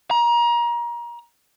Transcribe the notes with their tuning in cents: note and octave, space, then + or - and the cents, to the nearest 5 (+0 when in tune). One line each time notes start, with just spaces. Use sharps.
A#5 +30